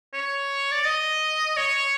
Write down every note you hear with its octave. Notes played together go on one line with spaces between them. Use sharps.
C#5
D5
D#5
C#5